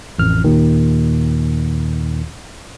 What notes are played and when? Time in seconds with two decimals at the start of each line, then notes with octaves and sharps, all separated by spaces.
0.19 A1 F2 F6
0.44 D#2 A#2 D#3